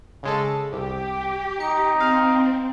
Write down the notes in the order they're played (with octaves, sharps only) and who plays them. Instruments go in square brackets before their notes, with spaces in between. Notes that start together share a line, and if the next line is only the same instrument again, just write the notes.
[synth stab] C#3 G#3 A4
[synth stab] C2 [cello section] G4
[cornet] D#4 [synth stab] C#7
[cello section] C4 [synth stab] F5